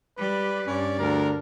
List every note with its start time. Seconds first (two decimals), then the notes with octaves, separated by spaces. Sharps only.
0.18 G3 B4 D5
0.67 G2 C#4 D5
0.99 D2 A#4